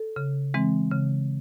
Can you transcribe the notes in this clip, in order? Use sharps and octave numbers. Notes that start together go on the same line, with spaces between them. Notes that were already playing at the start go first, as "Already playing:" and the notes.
Already playing: A4
C#3
E3 G#3 C4
C#3